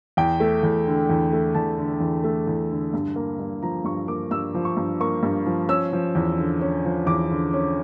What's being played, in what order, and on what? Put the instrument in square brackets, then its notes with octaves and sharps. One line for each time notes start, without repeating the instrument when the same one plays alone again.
[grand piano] E2 G5
A3
E2
D3
E2
A3
E2 A5
D3
E2
A3
E2
D3
G2
A#3
G2
F3 A#5
G2 C#6
A#3 D6
G2 E6
F3
C#6
G2
A#3 C#6
G2
F3
C#4 E6
F3
E2
D3
C#4
F3
E2 D6
D3
C#4